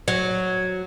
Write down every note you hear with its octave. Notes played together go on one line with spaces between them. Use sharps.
F#3